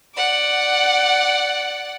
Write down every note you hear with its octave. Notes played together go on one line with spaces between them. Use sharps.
D5 F#5